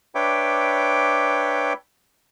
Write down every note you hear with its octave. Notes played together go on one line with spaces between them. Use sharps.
D4 B4 C#5 E5 G5 D6